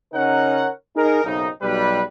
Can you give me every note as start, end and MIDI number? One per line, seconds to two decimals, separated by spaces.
0.14 0.69 49
0.14 0.69 61
0.14 0.69 63
0.14 0.69 70
0.14 0.69 73
0.14 0.69 78
0.96 1.25 63
0.96 1.25 68
0.96 1.25 70
1.25 1.48 35
1.25 1.48 42
1.25 1.48 49
1.25 1.48 60
1.25 1.48 63
1.62 2.02 35
1.62 2.02 55
1.62 2.02 67
1.62 2.02 71